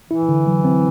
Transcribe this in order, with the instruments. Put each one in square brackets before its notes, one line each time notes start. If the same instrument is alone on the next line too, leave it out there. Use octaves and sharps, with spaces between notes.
[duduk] E3 [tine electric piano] E4
[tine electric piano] D3
F#3
C4